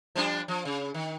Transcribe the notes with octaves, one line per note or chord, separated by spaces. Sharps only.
F3 G3 D4
F3
C#3
D#3